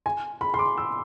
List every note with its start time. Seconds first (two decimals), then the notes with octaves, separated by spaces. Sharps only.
0.06 G#5
0.41 B5
0.54 C6
0.59 D6
0.78 E6